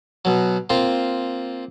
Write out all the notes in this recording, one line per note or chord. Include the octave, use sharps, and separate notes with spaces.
B2 F#3
A#3 C4 F4